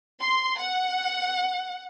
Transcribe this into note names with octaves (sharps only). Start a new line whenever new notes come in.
C6
F#5